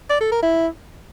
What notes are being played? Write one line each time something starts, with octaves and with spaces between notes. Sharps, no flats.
D5
A4
A#4
E4